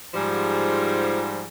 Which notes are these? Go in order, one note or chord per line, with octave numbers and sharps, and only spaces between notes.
G#2 F3 G3